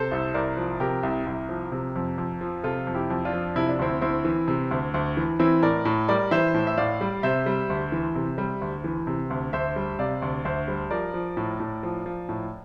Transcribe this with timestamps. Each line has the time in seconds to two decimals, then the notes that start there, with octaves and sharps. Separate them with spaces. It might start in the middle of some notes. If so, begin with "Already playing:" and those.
Already playing: C3 A4 C5
0.11 C2
0.34 C2 A#4 D5
0.57 F3
0.80 C3 G4 A#4
1.03 C2
1.26 C2
1.49 F3
1.72 C3
1.96 F2
2.18 F2
2.41 F3
2.64 C3 F4 A4
2.87 F2
2.94 E4 G4
3.10 F2
3.25 D4 F4
3.33 F3
3.56 C3 E4
3.69 D4
3.79 D2 C4 E4
4.01 D2 C4 E4
4.25 E3
4.48 C3
4.71 D2
4.94 D2
5.17 E3
5.39 E3 C4 E4
5.63 A2 A#4 D5
5.85 A2
6.08 G3 A#4 D5
6.31 E3 C5 E5
6.54 A2
6.67 E5
6.77 A2 D5 F5
7.01 G3
7.23 C3 C5 E5
7.46 G3
7.70 D2
7.92 E3
8.15 C3
8.38 G3
8.61 D2
8.84 E3
9.07 C3
9.30 D2
9.53 D2 C5 E5
9.76 G3
9.99 C3 D5 F5
10.22 D2
10.45 D2 C5 E5
10.68 G3
10.90 F3 A#4 D5
11.14 F3
11.37 A2
11.60 A2
11.83 F3
12.06 F3
12.29 A2